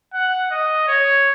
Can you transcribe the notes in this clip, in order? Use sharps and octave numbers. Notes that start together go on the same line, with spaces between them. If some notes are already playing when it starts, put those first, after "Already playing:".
F#5
D#5
C#5